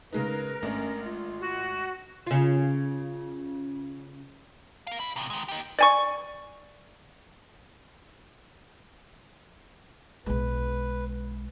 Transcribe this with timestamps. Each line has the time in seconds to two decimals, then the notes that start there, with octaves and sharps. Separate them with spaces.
0.13 C#3 G#3 D#4 A#4 B4
0.62 G#1 A3 C#4 D4
1.05 F4
1.40 F#4
2.27 C#3 F4
4.87 A#4 F5
5.00 D#5 B5
5.16 A2 C3
5.30 D#3 G#3
5.49 D#4 G4
5.78 D5 G#5 C#6
10.26 B1 G#3 B4